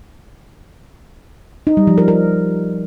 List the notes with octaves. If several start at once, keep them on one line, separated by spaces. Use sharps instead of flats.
D#4
G3
F3
A#4
A#4